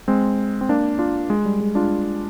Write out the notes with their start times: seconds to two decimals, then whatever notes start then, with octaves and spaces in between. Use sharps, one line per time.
0.08 G#3 C4
0.61 C4
0.69 A#3 D4
0.99 D4 F4
1.30 G#3
1.45 G3
1.61 G#3
1.75 D4 F4